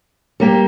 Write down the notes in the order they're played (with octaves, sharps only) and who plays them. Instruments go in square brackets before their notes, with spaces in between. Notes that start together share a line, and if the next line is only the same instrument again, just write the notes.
[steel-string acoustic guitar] G3 A#3 G4